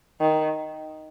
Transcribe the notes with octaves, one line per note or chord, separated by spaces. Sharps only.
D#3